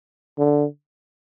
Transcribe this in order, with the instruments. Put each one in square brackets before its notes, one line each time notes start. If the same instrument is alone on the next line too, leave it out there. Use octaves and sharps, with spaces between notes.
[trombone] D3